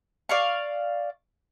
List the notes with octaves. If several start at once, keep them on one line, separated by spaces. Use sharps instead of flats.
D5 F5 C#6